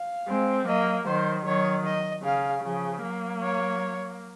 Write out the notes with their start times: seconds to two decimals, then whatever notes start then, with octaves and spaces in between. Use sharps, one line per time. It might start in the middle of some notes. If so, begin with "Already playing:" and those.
Already playing: F5
0.28 G#3 C4
0.67 F#3 A#3 D#5
1.06 D#3 F#3 C5
1.45 D#3 F#3 C#5
1.85 D#5
2.24 C#3 F5
2.63 C#3 F3
3.02 F#3 A#3
3.42 C#5